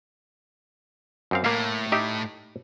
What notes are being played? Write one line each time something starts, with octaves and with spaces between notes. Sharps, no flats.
F#2 C4 F5
A2 A#3 F5
D#4 G4 E5